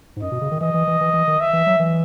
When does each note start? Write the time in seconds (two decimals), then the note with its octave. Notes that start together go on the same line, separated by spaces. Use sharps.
0.16 G#2
0.22 F#2 D#5
0.32 B2
0.41 C#3
0.51 D#3
0.61 E3 D#5
0.74 E3
0.87 E3
1.01 E3
1.13 E3
1.27 D#3
1.40 E5
1.53 E3
1.66 F#3
1.79 E3